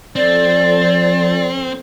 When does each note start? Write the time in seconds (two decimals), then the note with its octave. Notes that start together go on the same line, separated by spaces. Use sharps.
0.16 F3 C4 A4 D5